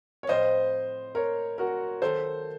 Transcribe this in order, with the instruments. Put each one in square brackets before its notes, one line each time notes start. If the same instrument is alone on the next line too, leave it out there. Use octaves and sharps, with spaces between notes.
[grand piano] C#5
[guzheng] A2 F3 C4 F4 [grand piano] C5 D#5
[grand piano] A#4 C#5
F#4 A#4
[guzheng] D#3 F#3 A3 [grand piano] A4 C5